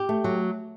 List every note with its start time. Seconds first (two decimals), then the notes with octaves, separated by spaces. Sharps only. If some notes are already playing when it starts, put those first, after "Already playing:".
Already playing: G4
0.09 A3
0.24 F#3